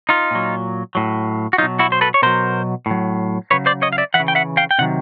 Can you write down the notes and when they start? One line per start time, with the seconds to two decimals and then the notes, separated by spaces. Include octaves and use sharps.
0.09 D#4 F4
0.31 A#2 F#3
0.95 A2 F#3
1.53 F#4
1.58 B2 F#3 D#4 F4
1.79 E4 F#4
1.92 C5
2.01 A4 B4
2.14 C#5
2.22 B2 F#3 A#4 C5
2.86 A2 F#3
3.51 C#3 F#3 B4 C#5
3.66 C5 D5
3.82 C#5 D#5
3.93 F5
3.98 D5 E5
4.14 E3 E5 F#5
4.20 C#3
4.28 G5
4.35 E5 F#5
4.57 F5 G5
4.71 G5
4.79 C3 D#3 F#3 F#5